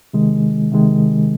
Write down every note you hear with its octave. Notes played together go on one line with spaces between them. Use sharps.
C3 D#3 G#3
C3 D#3 G#3